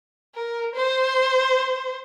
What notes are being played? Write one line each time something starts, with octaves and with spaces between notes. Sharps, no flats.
A#4
C5